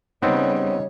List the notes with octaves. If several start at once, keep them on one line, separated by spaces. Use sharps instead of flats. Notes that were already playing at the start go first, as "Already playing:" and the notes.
C#3 G3 B3 C4 D#4 C#5